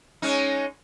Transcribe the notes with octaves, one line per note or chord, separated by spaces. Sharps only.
G#3 C#4 D#4